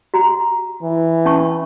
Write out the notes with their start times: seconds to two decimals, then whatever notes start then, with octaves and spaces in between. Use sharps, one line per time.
0.14 F#4 A#5
0.82 E3
1.25 C#4 A5 C#6